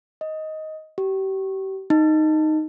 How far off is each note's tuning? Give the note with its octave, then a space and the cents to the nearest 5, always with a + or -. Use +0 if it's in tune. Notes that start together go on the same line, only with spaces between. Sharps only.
D#5 +10
G4 -35
D#4 -5